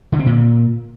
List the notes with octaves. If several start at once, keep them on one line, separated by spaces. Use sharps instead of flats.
D3
C4
A#2